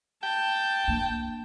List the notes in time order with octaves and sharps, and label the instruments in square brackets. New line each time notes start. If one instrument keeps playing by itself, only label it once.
[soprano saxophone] G5 [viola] A5
[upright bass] A#3 D4